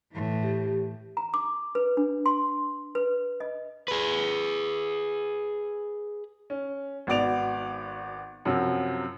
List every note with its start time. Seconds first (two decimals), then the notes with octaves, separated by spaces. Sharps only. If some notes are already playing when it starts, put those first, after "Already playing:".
0.12 A2 E3
0.43 G4
1.17 A#5
1.34 D6
1.75 B4
1.97 D4
2.26 C6
2.95 B4
3.40 D#5
3.88 G#4 B4
6.50 C#4
7.07 G#1 B3 F#4 D5 D7 F7
8.45 F#2 C3 F3 F#3